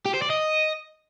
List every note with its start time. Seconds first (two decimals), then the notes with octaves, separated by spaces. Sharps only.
0.05 G4
0.14 C5
0.22 D5
0.30 D#5